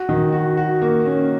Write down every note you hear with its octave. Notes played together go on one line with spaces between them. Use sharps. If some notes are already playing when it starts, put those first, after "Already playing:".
Already playing: F#4
D#3
F#4
F#4
A#3
C#4